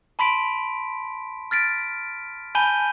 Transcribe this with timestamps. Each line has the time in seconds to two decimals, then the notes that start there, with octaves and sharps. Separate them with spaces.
0.19 A5 B5 C6 B6 D7
1.51 F6 A6 B6 D7
2.55 G#5 A5 B5 G6 D#7 G7